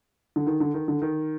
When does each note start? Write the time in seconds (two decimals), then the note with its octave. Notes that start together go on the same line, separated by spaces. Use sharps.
0.36 D3
0.47 D#3
0.60 D3
0.74 D#3
0.88 D3
1.02 D#3